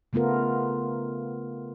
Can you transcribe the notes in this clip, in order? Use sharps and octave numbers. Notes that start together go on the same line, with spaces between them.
C#3 A3 B3 F4 A#4